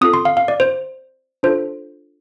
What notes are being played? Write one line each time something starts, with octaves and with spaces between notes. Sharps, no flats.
C4 F4 A4 D#6
C6
F5
F5
D5
C5
D4 F4 A4 C5